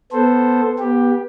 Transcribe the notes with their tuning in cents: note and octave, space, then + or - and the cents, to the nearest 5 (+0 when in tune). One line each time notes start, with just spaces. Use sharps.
B3 +0 A4 +0 C5 +0
B3 -25 G4 +10